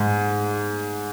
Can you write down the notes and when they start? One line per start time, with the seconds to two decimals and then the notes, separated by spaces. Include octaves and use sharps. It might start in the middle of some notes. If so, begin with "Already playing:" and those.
Already playing: G#2